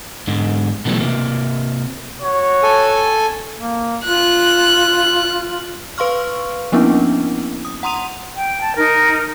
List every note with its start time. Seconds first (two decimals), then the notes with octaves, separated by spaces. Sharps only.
0.27 G#2 D3
0.85 B2 D3 E3 F#3 G3 A3
1.00 C3 A#3
2.22 F#4 C#5
2.63 A4 G#5
3.57 A#3
4.05 F4 F#6
5.98 B4 F5 C6 C#6 F6
6.72 F3 A#3 B3 C#4 D4 E4
7.65 D#6
7.83 F#5 A#5 C6 D#6 D#7 F7
8.35 G5
8.63 A5
8.76 D#4 A#4